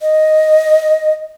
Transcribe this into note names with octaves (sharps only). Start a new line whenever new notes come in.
D#5